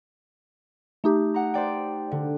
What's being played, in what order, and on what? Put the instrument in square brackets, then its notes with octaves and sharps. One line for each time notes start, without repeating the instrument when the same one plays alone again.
[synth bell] A3 D#4 G4
[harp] F#5 A#5
C5 D5 G5
D3